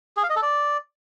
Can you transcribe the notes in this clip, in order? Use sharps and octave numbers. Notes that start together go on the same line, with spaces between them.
G#4
F5
D#5
A4
D5